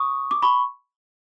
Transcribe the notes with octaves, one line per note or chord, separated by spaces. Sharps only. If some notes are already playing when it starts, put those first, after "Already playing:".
Already playing: C#6 D#6
D6
B5 C#6